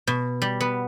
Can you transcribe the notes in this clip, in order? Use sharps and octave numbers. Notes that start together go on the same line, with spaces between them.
B2
G3
B3